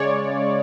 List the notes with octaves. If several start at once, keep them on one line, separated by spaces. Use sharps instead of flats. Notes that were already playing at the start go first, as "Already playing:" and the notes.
Already playing: C#3 G#3 C#5 D5